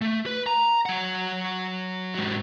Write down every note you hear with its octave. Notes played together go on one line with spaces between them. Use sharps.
A3
B4
A#5
F#3 F#5
G#2 F#3